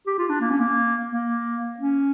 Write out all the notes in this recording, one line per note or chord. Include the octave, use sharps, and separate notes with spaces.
G4
F4
D4
A#3
C#4
A#3
A#3
C#4